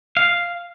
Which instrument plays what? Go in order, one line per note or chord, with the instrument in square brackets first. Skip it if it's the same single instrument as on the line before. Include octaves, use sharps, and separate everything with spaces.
[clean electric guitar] F5